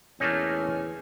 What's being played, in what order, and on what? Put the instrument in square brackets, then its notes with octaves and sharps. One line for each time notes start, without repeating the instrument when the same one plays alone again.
[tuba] E2 [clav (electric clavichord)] A3 A#3 D#4 [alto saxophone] C#4